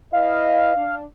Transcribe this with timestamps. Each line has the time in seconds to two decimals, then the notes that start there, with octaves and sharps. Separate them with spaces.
0.13 E4 B4 D#5 F5
0.76 D4